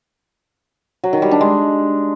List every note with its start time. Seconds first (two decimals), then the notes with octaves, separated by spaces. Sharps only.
1.04 F#3
1.13 D#3
1.22 G3
1.31 D4
1.41 G#3